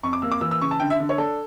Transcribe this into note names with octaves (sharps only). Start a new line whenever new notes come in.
F2 C#6
D6
A#3 E6
D6
E3 E6
E6
C#3 C#6
A5
D3 G5
E5
D3
C#5
D4 A4